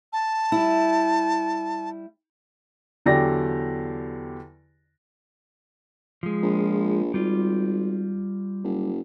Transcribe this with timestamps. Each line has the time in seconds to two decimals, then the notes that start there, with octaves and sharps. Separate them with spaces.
0.13 A5
0.52 G3 E4
3.06 E2 D3 F#3 G4 D5 A#6
6.23 F3 G#3
6.43 A#1
7.14 G#1 G3 F4
8.64 F#1